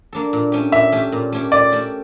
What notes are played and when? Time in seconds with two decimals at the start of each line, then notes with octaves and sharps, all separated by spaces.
0.13 A#3 D4 A4
0.33 A#2
0.52 A3 C#4 G4
0.72 A#2 E5
0.92 A3 C#4 G4
1.12 A#2
1.32 A3 C#4 G4
1.52 A#2 D5
1.72 A3 C#4 G4